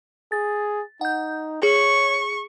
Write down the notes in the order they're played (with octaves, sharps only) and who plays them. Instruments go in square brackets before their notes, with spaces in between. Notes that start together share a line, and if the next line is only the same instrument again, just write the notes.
[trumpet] G#4 [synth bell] A6
[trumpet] D#4 [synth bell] F#5 G6
[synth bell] G#4 [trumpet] C#5 [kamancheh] C#6